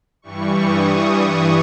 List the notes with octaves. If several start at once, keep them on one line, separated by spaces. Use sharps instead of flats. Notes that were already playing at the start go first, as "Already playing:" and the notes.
G2 E3 G3 C#6
D#6